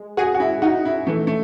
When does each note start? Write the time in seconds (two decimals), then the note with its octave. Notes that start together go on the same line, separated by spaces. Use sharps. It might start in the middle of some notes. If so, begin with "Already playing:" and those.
Already playing: G#3
0.17 F#4 G#4
0.35 F#4
0.40 E4
0.62 D#4 F#4
0.85 E4
1.07 E3 A3
1.27 A3